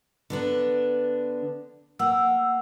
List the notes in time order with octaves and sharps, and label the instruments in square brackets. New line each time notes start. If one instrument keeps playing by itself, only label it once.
[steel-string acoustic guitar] D3 B3 D4
[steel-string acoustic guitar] A#3 [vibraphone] F#5 E6